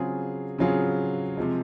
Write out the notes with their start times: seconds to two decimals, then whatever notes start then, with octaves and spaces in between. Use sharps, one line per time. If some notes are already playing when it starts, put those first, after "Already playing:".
Already playing: C#3 F#3 C4 F4 G#4
0.58 C#3 F#3 C4 F4 G#4
1.37 C3 F3 G#3